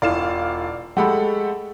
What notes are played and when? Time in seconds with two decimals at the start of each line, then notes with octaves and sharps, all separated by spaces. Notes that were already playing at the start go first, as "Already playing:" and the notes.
0.02 E1 F4 D5 F5 E7
0.97 G#3 A3 G4 A4 F#5 B5